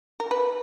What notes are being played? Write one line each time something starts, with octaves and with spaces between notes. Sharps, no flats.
A#4
B4